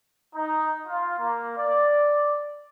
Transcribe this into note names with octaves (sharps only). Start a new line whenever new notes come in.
D#4
F4
A#3
D5